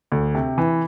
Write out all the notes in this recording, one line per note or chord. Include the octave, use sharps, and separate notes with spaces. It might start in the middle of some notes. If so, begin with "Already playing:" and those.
D2
C3
E3